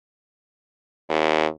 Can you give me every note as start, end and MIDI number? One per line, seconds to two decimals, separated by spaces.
1.09 1.47 39